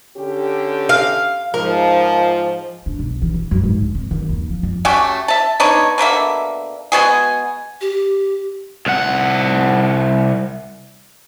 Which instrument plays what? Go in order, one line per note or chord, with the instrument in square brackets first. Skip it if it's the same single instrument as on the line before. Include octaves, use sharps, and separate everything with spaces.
[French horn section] D3 C#4 G4
[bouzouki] F5
[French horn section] G#2 F3 [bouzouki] A#4
[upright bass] D4
B1
E3
E3
F#2
G#2
D2
C4
D#3
D#2
F3
F2
[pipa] A3 C#4 F#4 G4
E5 A5
B3 D4 D#4 C#5
B2 D3 A#3 E5
G#3 B3 F#4 G#4
[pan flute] G4
[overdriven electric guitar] C2 F#5